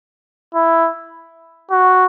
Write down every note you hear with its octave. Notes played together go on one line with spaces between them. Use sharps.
E4
F#4